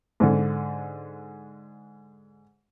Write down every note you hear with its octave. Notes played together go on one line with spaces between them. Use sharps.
G#2 D3